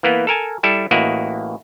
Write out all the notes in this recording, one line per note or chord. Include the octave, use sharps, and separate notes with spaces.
E3 A#3 B3
A4 A#4 G#5 A5
G3 E4 A4 A5
A1 A#3 E4 F#4 D#5 F#5